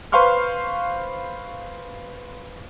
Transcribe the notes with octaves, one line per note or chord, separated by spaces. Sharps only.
B4 C5 F5 C6 C#6 F6